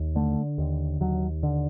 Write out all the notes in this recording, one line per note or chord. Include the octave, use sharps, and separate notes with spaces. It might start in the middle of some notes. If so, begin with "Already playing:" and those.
Already playing: D#2
D3 A3
D#2
D#2 F#3
D3